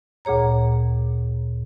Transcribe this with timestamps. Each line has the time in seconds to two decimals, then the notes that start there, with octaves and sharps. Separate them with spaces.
0.25 D2 A#2 G#4 C#5 A#5